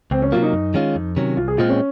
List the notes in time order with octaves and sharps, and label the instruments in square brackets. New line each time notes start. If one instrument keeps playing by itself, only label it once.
[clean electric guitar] C#2 [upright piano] C4
[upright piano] C#4
[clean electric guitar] C3 F#3 A#3 [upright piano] F4
[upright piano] D#4
[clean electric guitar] F#2
D#3 G#3 C#4 F4
F2
C3 D#3 F#3 C#4
[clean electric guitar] C2 [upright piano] F4
[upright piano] G#4
[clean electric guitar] A#2 G#3 C4 [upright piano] F4
[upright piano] C#4